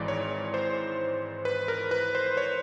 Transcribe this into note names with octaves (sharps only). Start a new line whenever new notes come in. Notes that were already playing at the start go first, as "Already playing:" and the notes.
Already playing: G#1 G#2 E3 D5
C#5
C5
B4
A#4
B4
C5
C#5